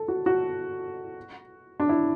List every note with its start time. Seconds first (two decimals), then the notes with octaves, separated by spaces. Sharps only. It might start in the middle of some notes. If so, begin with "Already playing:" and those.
Already playing: A4
0.08 F#4
0.26 F#4
1.80 D4
1.89 E4